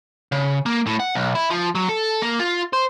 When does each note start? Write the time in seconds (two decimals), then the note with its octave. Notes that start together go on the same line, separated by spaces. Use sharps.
0.32 C#3
0.66 A#3
0.87 A2
1.00 F#5
1.15 B1
1.35 E4
1.50 F3
1.75 F#3
1.89 A4
2.22 A#3
2.40 F4
2.73 C5